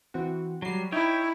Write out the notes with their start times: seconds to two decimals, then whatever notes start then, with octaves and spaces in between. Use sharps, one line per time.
0.14 E3 C4 F#4
0.62 F#3 G3 F#4 C7
0.92 D#4 E4 C#5 G5